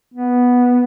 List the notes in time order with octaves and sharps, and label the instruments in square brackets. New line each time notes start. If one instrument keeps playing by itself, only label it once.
[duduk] B3